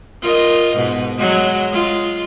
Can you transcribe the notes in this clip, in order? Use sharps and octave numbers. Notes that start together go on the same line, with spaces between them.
F4 A#4 D#5
G#2 B2
F#3 G#3
G#3 F4